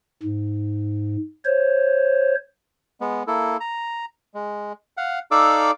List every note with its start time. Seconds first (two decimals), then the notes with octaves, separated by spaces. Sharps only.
0.23 G#2
1.45 C5 C#5
3.01 G#3 B3
3.27 A#3 E4 A4
3.60 A#5
4.34 G#3
4.97 F5 F#5
5.31 D#4 A4 D5 F5 D6 E6